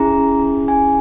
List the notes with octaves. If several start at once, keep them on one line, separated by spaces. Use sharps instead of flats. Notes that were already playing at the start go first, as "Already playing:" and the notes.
Already playing: C#4 E4 G#4 A#5
G#5